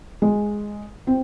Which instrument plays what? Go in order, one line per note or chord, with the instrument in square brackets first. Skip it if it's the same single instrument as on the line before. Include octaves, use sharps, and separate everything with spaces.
[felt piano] G#3
C4